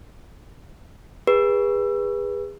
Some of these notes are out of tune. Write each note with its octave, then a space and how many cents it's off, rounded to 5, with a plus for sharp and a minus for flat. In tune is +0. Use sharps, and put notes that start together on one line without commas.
G#4 -30 B4 -20